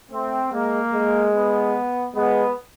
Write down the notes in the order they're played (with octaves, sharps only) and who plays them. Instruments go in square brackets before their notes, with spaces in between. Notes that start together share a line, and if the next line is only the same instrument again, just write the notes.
[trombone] A3 [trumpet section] C4
[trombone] G#3 [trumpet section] A#3
[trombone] G#3
[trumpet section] B3
[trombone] G#3 [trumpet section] B3